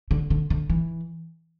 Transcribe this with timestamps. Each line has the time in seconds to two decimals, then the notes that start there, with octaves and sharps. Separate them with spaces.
0.11 D3
0.30 D3
0.50 D3
0.70 E3